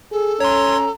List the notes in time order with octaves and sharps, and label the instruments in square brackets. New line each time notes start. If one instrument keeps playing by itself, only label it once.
[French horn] G#4 [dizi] A4
[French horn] C#4 [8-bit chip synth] C#5 C6 [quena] A#5